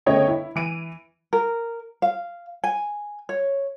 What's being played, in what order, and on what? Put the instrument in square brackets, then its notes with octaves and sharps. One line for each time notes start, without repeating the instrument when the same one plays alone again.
[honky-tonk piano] G1 C#3 A3 C#5 D#5 G5
E4
E3 D7 D#7
[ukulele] A#4
F5
G#5
C#5